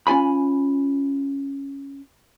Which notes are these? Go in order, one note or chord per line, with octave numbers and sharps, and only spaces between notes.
C#4 F4 G#5 B5